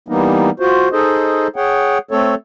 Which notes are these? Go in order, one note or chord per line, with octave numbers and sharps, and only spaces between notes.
E3 G3 A#3 B3 D#4
F4 F#4 C5
D#4 G#4 A4 C5 D#5
G#4 C#5 F#5 G5
A3 C4 A4 C#5